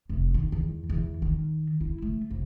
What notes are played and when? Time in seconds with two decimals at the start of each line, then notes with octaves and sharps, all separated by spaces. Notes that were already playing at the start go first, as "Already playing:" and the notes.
0.09 F1
0.34 D#3
0.52 E2
0.90 E2
1.22 D#3
1.81 E4
2.02 A3
2.31 F1